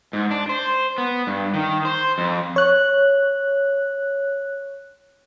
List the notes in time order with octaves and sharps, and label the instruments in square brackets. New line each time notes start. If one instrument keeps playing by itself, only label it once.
[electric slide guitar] G#2
D4
C5
B3
G2
D#3
C5
F2
[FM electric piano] C#5 F#6